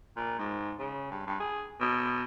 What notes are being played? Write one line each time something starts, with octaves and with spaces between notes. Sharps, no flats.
A#2
G#2
C#3
G2
G2
G#4
B2